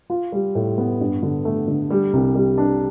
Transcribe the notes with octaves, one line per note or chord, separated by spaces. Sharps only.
F4
G3
A2
B3
G2
D3
A3
D3
G3
C2
G3
D4